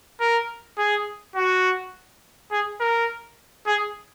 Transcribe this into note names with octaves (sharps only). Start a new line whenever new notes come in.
A#4
G#4
F#4
G#4
A#4
G#4